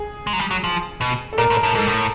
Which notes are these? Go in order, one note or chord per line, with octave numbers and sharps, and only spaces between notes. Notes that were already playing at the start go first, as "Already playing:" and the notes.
Already playing: G#4
G#3
F#3
G3
F#3
F3
B2
A4
A#2 A#4
A2
A#4
A2
G#2 A4
A2